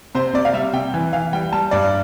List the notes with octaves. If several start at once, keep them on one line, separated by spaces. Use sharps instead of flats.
C3 C5
C3 D5
F5
G3 E5
C3 G5
E3
E3 F5
G3 G5
G3 A5
G2 D5